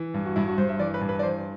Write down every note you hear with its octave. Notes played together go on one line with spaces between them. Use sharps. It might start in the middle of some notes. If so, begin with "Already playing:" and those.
Already playing: E3
G2
F#4
G2 E4
F#4
G2 C5
E5
E3 D5
B4
G2
B4
D5
E3 C5